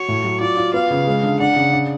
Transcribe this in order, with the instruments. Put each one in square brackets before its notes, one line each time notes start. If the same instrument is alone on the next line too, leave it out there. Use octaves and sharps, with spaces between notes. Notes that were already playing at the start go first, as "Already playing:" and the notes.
Already playing: [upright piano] F#4 [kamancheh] C#5
[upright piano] A2
F#3
[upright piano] F4 [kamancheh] D5
[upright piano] F4
[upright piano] B3 [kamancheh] F5
[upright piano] C#3
G#3
D3
[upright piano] D4 [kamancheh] F#5
[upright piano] C#3
D4